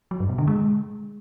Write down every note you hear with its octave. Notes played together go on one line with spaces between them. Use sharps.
F#3
G2
B2
D3
G#3